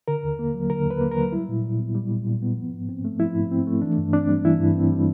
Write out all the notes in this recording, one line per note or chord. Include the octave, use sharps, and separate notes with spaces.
D3 A#4
D#2
A#3
F#3
D3 A#4
D#2
B4
A#3
A#4
F#3
G3 E4
A#2
A#2
B3
G3
A#2
A#2
B3
F3
G#2
C4
A3
F3 E4
G#2
C4
A3
E3 D4
G2
C4 D4
G3
E3 E4
G2
C4
G3